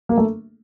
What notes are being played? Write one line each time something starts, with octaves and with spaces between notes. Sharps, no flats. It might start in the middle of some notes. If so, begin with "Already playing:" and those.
A#3
A3